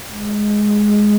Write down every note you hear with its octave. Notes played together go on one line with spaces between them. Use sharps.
G#3